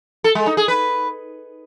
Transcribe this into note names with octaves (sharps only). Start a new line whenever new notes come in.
A4
G#3
D#4
G#4
B4